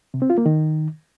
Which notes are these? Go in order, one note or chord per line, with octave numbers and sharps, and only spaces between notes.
C3
C4
F4
A#3
D#3